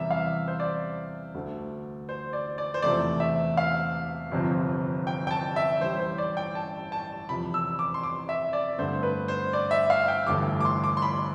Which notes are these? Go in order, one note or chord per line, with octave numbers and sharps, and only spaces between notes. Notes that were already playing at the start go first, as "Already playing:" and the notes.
Already playing: E2 C3 E3 G3 E5
F5
C5
D5
D2 D3 A3
C5
D5
D5
C5
E1 E2 C3 F3 A3 D5
E5
F5
G1 F2 C3 F3 C4
G5
G5
A5
E5
A1 A2 G3 C5
C5
D5
G5
A5
A5
F1 E2 C3 F3 B5
E6
D6
C6
D6
E5
D5
G2 D3 A3 C4 C5
B4
C5
D5
E5
F5
G5
G1 G2 E3 A3 D6
D6
C6
D6
C6
B5